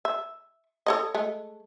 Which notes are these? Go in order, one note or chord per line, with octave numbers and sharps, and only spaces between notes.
E5
A4 C#5 D#5
G#3 A3